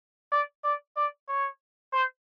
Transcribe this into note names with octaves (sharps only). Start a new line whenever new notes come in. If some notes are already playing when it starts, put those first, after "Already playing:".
D5
D5
D5
C#5
C5